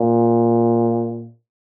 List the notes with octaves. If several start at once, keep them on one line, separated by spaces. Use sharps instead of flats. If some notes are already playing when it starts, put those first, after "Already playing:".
Already playing: A#2